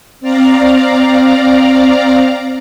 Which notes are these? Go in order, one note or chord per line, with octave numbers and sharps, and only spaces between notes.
C4 D5 F5 A#5